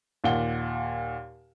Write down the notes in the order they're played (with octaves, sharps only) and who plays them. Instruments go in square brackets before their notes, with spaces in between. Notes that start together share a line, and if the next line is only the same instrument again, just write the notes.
[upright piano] D#2 A#2 F#5 G7